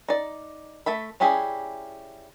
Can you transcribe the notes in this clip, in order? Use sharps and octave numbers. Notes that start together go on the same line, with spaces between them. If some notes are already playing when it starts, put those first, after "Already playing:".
D#4 D5
A3 E5 B5
G3 C#4 E4 G4 G#4